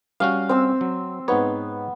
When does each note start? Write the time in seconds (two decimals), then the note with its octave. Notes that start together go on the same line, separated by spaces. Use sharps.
0.20 G3 C#4 F#4 F5
0.49 C4 E6
0.81 F#3
1.28 G#2 B3 D#4 C#5